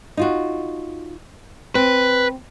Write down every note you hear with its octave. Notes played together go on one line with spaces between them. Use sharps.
D#4 F4 F#4
C4 B4